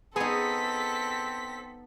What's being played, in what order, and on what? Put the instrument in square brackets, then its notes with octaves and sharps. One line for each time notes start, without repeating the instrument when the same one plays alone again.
[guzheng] B3 D#4 [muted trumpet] C4 [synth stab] G#4 [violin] A4 B6